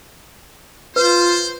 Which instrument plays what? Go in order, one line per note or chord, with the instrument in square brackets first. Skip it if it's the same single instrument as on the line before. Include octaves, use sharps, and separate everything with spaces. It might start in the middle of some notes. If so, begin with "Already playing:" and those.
[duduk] F4 [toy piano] B4 [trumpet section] C5